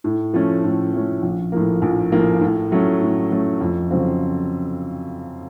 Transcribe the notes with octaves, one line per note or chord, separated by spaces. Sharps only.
A2
F3 A3 C#4
A2
F3 A3 C#4
A#1
A2 F3 A#3
A#1
A2 F3 A#3
A2
F#3 A3 C#4
A2
F#3 A3 C#4
F2
C#3 F#3 C4 F4